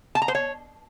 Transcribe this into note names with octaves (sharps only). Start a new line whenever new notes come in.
A5
A#5
C5
C#5